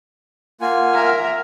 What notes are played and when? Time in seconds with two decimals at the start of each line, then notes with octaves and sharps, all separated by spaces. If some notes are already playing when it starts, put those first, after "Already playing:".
0.61 A#3 F4 F#5 G#5
0.94 A#4 E5